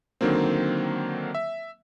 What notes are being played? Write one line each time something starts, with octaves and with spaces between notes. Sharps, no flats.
D3 D#3 F#3 A#3 C4
E5